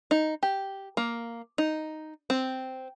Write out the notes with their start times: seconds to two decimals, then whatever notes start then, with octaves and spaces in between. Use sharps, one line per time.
0.11 D#4
0.43 G4
0.97 A#3
1.58 D#4
2.30 C4